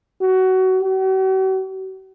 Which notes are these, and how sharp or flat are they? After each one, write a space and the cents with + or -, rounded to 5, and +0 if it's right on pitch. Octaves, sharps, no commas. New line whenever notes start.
F#4 +20
F#4 +45